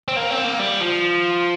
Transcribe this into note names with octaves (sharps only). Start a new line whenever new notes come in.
C4
A#3
C4
A#3
G3
F3